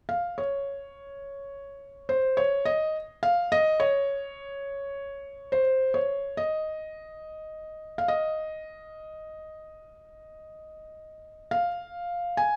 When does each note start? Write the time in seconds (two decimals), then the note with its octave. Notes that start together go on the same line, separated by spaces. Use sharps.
0.09 F5
0.38 C#5
2.09 C5
2.37 C#5
2.65 D#5
3.23 F5
3.52 D#5
3.80 C#5
5.52 C5
5.94 C#5
6.37 D#5
7.98 F5
8.08 D#5
11.51 F5
12.37 G#5